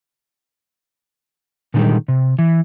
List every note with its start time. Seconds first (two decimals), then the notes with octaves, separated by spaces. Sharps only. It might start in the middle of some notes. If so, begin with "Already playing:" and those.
1.74 A#2 D3 D#3 F3 G3 G#3
2.08 C3
2.39 E3